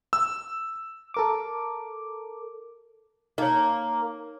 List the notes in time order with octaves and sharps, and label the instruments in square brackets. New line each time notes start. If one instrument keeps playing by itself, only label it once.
[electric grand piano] E6
[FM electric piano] A4 A#4 D6
[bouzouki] A#3 [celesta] D#4 C#5